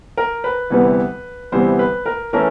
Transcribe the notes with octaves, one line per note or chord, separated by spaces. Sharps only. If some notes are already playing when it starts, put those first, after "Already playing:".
A#4
B4
D2 C3 E3 G3 B3
D2 C3 E3 G3 B3 C5
B4
A#4
E3 A3 C#4 A#4